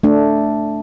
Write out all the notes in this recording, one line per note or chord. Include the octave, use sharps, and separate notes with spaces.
A3 D4